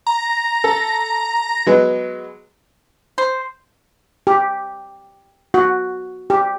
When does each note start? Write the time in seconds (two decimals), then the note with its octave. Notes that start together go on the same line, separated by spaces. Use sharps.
0.07 A#5
0.64 A4
1.66 F#3 G#3 B3
3.18 C5
4.27 G4
5.54 F#4
6.30 G4